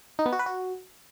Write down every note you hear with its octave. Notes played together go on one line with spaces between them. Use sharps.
D#4
B3
F#4
B4
F#4